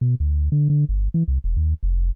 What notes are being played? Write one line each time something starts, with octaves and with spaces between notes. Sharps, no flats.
B2
D2
D3
D3
G1
E3
C2
E1
D#2
F1